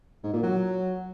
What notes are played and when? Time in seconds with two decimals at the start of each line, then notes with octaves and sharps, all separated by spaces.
0.23 G#2
0.33 A#2
0.43 F#3